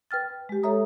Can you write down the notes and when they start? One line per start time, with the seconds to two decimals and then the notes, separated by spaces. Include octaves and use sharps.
0.11 B4 G5 F6 A6
0.49 G#3 G4
0.63 A4 C#5 E5 A#5 D#6